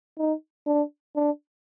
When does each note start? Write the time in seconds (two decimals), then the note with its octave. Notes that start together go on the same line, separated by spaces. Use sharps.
0.18 D#4
0.67 D4
1.16 D4